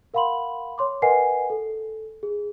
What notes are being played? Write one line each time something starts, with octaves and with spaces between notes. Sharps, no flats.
A#4 F5 F#5 B5 C6 F#7
C#5 C6 D6
A#4 B4 D#5 F#5 G#5 C7
A4
G#4